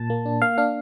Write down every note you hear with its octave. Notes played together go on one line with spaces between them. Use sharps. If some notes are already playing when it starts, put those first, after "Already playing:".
Already playing: A#2 A5
A#3
D4
A#3 F5
D4 F5